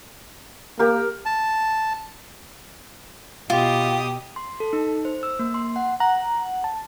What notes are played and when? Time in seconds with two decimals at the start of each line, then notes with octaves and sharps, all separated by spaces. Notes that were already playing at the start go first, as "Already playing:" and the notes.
0.79 A#3 G4 A#4
1.25 A5
3.50 B2 F4 G4 D#6
4.36 C6
4.60 A4
4.73 D#4
5.05 C5
5.23 E6
5.39 A#3
5.54 C6
5.76 F#5
6.00 F#5 A#5
6.64 A5